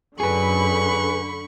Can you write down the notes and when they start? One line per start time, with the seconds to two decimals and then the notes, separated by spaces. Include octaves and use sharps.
0.20 F#2 D3 G#4 B4 B5 C#6